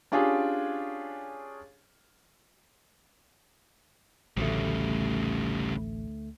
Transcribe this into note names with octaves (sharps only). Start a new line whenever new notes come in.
C#4 D4 F4 G4 G#4
A1 D2 C#3 G3 A3